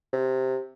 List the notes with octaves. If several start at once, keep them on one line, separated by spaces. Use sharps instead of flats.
C3